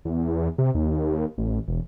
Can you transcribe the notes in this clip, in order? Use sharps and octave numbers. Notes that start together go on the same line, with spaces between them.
E2
C3
D#2
A1
E1